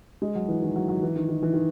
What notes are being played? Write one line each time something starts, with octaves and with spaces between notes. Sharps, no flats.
G#3
F#3
E3
D#3
F#3
F#3
E3
D#3
D#3
E3
D#3